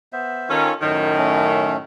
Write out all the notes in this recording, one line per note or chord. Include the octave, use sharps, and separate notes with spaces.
B3 C5 E5
D#3 C#4 F4 A4 C#6
F#2 A2 D#3 C5
A3 C#4